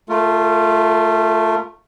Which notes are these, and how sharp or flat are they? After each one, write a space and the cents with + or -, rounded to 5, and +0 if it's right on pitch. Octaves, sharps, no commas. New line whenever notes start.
A3 +0 F4 +0 A#4 -35